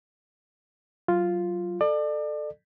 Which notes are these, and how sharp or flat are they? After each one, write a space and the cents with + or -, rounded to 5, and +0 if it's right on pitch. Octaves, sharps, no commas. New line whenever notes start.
F#3 +20 F4 +0
A4 +0 D5 +35